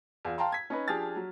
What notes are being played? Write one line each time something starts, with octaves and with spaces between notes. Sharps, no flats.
E2 F4
F5 G5 A5 A#5 C6
G#6 B6
C#4 D#4 B4
F3 D4 G4 G#4 F6 A6
F#3